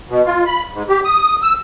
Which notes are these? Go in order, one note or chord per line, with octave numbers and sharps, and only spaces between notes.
B2
F4
B5
G#2
G4
D#6
E6